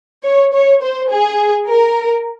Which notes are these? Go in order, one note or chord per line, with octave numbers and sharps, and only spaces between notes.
C#5
C#5
C5
G#4
A#4